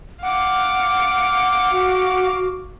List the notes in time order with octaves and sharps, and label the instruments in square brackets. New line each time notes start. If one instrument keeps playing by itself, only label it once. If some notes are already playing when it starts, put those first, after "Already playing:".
[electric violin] F5 D6 [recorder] F#5
[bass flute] F#4